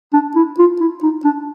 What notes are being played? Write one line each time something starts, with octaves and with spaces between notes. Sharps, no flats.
D4
E4
F4
E4
D#4
D4